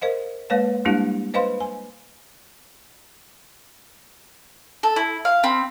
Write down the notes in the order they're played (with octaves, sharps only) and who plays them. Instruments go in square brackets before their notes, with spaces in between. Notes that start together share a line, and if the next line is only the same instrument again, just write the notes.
[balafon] A#4 C5 D#5 F5
G#3 A#3 B4 C#5 F5
G3 G#3 A#3 D4 E4 G4
B4 C5 D#5 F5 B5 C6
G#5
[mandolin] A4
E4
F5
C4 B5